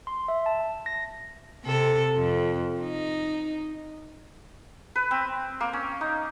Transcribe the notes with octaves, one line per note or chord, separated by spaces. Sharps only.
C6
E5
A5
A#6
C3 A4
F2
D#4
B4
C4
A#3
C#4
D#4